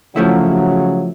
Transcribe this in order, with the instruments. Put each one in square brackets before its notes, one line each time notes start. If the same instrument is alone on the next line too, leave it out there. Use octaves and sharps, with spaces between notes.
[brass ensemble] C#3 F#3 [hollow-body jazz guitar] F3 A3 E4